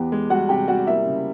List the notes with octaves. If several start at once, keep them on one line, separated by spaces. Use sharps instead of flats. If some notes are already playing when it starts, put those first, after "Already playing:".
Already playing: E2 B3 G4
G#3
G3 F#4 F#5
C3 G4 G5
G3 F#4 F#5
A#3 E4 E5
C#3